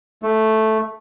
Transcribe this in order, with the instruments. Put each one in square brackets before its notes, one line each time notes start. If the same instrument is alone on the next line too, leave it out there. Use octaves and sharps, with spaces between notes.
[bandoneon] A3